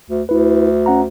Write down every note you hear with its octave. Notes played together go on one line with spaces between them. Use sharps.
D2
D2 E4 B4
C#4 F#5 A#5